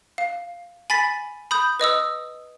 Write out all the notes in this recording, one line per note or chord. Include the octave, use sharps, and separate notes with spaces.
F5
G#5 B5 A6 B6
B5 D#6 G6
B4 D#5 D#6 E6